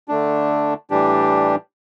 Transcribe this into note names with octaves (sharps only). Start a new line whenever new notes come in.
D3 A3 D4
A2 E3 G3 D4 G4